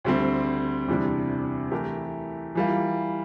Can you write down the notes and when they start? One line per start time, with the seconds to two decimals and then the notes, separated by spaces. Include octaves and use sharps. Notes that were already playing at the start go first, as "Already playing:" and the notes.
0.04 D2 D3 G3 C4
0.88 E2 C3 G3 D4
1.71 E3 A3 E4 G4 A#4
2.55 E3 G3 A#3 F4